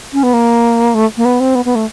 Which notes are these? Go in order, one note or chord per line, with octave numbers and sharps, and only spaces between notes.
C#4
B3
A#3
A3
A#3
B3
C4
B3
B3
A3